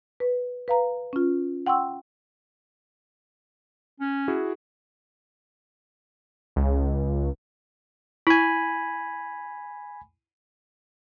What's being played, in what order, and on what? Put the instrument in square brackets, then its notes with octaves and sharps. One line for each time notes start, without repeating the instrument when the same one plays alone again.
[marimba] B4
B4 F5 A#5
C#4 F4
F#5 G5 C6 C#6 E6
[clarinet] C#4
[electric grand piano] E4 F#4 G#4
[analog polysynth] C#2
[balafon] E4 [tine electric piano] G#5 B5